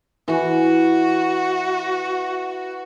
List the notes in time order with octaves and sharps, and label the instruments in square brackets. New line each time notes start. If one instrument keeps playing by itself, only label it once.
[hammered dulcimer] E3 [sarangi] F#4